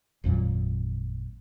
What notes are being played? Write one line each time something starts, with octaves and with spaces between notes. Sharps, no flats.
G#1 F2 A#2 F#3